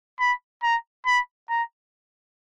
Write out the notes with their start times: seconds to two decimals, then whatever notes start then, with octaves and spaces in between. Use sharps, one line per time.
0.20 B5
0.63 A#5
1.07 B5
1.50 A#5